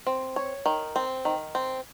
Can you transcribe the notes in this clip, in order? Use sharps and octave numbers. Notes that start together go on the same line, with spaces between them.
C4
C#5
D#3
C4
D#3
C4